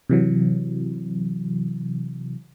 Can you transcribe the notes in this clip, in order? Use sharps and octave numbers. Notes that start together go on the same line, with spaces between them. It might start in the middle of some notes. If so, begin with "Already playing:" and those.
C3 E3 F#3